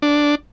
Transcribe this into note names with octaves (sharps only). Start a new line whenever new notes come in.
D4